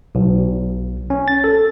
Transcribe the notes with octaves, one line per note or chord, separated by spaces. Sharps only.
B1
C#4
A6
A4